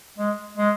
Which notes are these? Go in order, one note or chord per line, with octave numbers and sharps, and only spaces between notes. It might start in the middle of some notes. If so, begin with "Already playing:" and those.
G#3
G#3